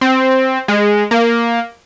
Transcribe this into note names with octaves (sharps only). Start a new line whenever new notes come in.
C4
G#3
A#3